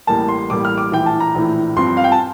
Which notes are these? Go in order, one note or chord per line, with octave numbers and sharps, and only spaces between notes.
A1 A2 G3 A#3 A5
C6
A1 A2 G3 A#3 D6
F6
D6
A#1 A2 E3 G5
A5
A#5
A#1 A2 E3
G2 F3 C4 C6
F5
G5
A5